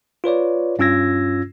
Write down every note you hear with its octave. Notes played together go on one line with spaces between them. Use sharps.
F4 B4 C#5 D5
G2 C#4 F4 E6 G#6 A#6